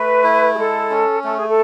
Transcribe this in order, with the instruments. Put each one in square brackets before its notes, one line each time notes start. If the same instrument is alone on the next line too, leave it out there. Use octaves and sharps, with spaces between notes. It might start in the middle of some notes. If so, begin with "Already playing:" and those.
Already playing: [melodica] A3 [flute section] B4
[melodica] E4
[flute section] G#4
[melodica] G#3 [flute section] A4
[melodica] C#4
[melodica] A3 [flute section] A4
[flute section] G#4
A4